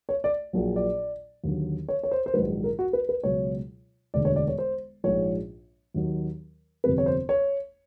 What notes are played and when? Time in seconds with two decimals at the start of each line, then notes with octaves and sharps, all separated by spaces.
0.09 C#5
0.24 D5
0.53 A#1 A#2 F#3
0.76 D5
1.44 D#2 D3 F#3
1.89 C#5
2.03 C#5
2.11 C5
2.26 C5
2.34 A#1 G#2 D#3 F#3 B4
2.64 A#4
2.79 F#4
2.93 B4
3.09 B4
3.24 C#2 B2 F#3 C#5
4.14 E1 D2 D3 D5
4.25 C#5
4.36 D5
4.48 C#5
4.58 C5
5.04 A#1 G#2 F3 C#5
5.94 D#2 D#3 F#3
6.84 G1 F2 C3 B4
6.98 C#5
7.06 C5
7.29 C#5